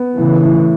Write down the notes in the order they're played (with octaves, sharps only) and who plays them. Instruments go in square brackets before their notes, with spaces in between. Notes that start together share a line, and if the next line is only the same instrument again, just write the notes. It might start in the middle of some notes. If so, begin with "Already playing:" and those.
Already playing: [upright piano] B3
[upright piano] A2 [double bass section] C#3 E3
[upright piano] A2